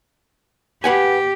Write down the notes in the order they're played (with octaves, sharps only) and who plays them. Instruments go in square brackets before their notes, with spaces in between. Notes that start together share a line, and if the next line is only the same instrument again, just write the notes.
[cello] G4 [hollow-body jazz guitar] B4 F#5 G#5